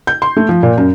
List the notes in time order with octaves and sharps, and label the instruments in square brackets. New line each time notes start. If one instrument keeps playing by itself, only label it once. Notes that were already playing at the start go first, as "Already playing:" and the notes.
[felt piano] G6
C6
A3
F3
A#2
F#2